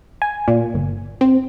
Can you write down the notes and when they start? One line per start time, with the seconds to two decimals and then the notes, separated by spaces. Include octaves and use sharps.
0.22 G#5
0.48 A#2
0.74 G1
1.21 C4